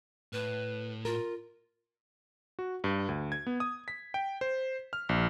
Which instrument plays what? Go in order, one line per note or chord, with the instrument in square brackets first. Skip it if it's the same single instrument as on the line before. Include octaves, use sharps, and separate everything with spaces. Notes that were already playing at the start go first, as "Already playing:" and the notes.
[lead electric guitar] A2 [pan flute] B4
[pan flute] F4 [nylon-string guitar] A#4
[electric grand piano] F#4
G2
D2
G#6
B3
D#6
B6
G5
C5
F6
A#1